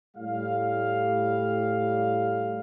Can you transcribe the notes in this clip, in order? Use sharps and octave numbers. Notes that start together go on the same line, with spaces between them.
A2 G3 F5